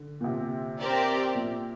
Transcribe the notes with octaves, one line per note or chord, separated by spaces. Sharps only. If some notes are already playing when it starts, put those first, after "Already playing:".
Already playing: D3
A#2
C3
C4 G4 A#4 D5
A#2